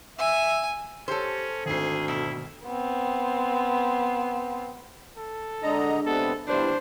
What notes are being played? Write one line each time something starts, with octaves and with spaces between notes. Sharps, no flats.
E5 G#5
C#4 G4 A4 C5 C#5 A5
G#1 D2 G#4 C7
B2 E4
B3 C4
A4
D3 G#3 D4 D#5 A#5
C3 B3 A4
G3 B3 D4 E4 C5